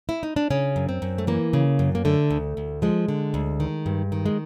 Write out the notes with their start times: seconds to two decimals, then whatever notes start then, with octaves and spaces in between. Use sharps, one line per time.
0.09 E4
0.23 D#4
0.36 D4
0.50 C#3 C#4
0.76 F#2
0.89 C4
1.02 F#2
1.18 A3
1.27 E3 A#3
1.53 C#3
1.79 F#2
1.95 A#3
2.05 D3 A3
2.30 D2
2.57 D2
2.82 F3 G#3
3.08 D3
3.34 D2
3.60 D#3
3.86 G2
4.12 D#3
4.26 G#3